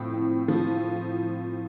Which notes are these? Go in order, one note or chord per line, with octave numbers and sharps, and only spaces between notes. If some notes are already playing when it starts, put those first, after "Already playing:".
Already playing: A2 F3 C4
C4
F3